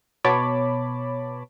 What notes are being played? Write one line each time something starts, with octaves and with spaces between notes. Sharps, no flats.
B2 B3 C#5 A5 B5 D6